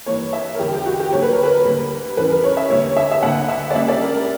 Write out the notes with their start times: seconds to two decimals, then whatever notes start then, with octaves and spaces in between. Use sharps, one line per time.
0.06 G2 E3 A#3 C#5
0.33 E5
0.55 A#4
0.59 E2 D3 G3 G4
0.73 G4
0.86 F#4
0.99 G4
1.12 D2 D3 F#3 A#3 C#5
1.22 B4
1.33 A#4
1.43 B4
1.65 D2 D3 G3 A#3
2.17 E2 C#3 E3 G3 B4
2.30 A#4
2.44 C#5
2.57 E5
2.70 D2 D3 G3 A#3 C#5
2.97 E5
3.12 E5
3.23 D2 D3 A#3 F#5
3.48 E5
3.70 D5
3.75 C#2 C#3 G3 A#3 E5
3.88 D5
4.01 A#4
4.14 A#4